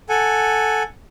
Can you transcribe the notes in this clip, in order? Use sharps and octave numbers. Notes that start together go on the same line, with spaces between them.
A4 F#5 G#5